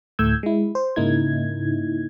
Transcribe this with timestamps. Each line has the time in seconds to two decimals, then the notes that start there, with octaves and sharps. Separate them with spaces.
0.19 D2 A2 A3 E6 G6 G#6
0.43 G#3 E4
0.75 C5
0.96 G#2 C#3 A#3 D#4 E4 G#6